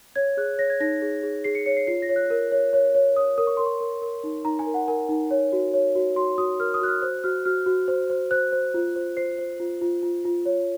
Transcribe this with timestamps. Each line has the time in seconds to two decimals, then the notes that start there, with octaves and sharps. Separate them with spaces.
0.16 C#5 G#6
0.37 G#4 F#6
0.58 C#5 A#6
0.70 G#6
0.80 D#4 A#6
1.02 G#4
1.23 G#4
1.44 G#4 C7
1.55 C#7
1.66 C#5 C#7
1.77 C7
1.87 F4 C7
2.02 A#6
2.09 C#5
2.16 F#6
2.30 A#4
2.52 C#5
2.73 C#5
2.95 C#5
3.16 C#5 D#6
3.38 A#4 D#6
3.47 C#6
3.57 A#4 C6
3.66 C#6
3.81 A#4
4.02 A#4
4.24 D#4
4.45 D#4 A#5
4.59 G#5
4.66 A#4
4.74 F#5
4.88 A#4 G#5
5.09 D#4
5.31 C#5
5.52 F#4
5.74 C#5
5.95 F#4
6.16 F#4 C6
6.38 F#4 D#6
6.60 A#4 F6
6.74 D#6
6.81 F#4 F#6
6.88 F6
7.02 C5 F#6
7.24 F#4 F6
7.45 F#4 F6
7.66 F#4
7.88 C5
8.10 C5
8.31 C5 F#6
8.52 C5
8.74 F4
8.96 C5
9.17 C5 C7
9.39 C5
9.60 F4
9.81 F4
10.03 F4
10.25 F4
10.46 C#5